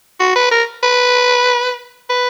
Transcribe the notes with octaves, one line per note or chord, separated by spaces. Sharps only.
F#4
B4
A#4
B4
B4